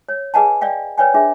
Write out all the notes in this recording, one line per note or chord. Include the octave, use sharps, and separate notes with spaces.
C#5
G#4 B4 D#5 F#5 G#5 A5
D5 D#5 F5 G5
B4 C#5 D5 G5 G#5
D4 G#4 E5